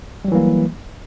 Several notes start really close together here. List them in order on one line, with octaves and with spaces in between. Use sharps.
G3 F#3 E3 A#3